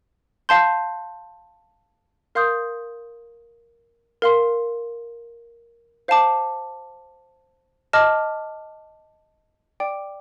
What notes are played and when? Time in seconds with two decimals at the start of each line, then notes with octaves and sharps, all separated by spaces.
0.49 F5 A5 C6 G6
2.35 A#4 F5 C6 D#6 G6
4.22 A#4 F5 C6
6.08 C5 F5 A5 D6
7.93 D#5 A5 D6 F6
9.80 D5 G5 D6